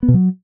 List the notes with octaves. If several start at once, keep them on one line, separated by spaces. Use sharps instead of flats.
B3
B2
F#3